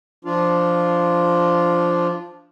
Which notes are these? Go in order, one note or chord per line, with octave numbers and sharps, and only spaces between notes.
F3 D4 F4